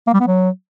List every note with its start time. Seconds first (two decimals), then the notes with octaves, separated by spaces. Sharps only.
0.07 A#3
0.14 G3
0.20 B3
0.27 F#3